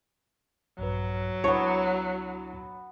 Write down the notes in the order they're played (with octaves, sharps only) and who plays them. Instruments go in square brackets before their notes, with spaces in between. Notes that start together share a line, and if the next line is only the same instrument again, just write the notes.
[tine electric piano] A#1 G2 B4 [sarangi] F#3
[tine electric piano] C#2 D4 E4 [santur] B3 A5 [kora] C#5